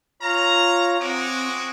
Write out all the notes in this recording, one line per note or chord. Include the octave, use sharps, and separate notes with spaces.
F4 C#5 F5 A#5
G#3 C4 F#4 D6